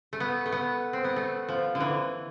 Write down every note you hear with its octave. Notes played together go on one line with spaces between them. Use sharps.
A3
B3
A3
B3
C4
B3
A3
F3
D3
E3